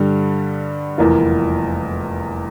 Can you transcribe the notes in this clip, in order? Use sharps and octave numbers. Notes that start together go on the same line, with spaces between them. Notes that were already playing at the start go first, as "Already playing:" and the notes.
Already playing: G2 D3 G3
F1 E2 E3 A#3 F4